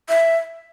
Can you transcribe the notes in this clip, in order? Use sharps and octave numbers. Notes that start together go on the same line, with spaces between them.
E5